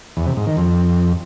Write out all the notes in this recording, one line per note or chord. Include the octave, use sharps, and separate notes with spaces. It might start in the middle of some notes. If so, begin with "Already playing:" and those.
E2
C3
G#2
D#3
F2